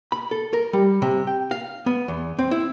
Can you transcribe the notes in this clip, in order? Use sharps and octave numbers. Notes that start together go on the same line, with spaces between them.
B5
A4
A#4
G3
C3
G5
F5
B3
E2
C4
E4